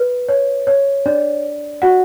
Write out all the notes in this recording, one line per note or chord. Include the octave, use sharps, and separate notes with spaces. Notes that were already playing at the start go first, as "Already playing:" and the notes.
Already playing: B4
C#5
C#5
D4 D5
F#4 F#5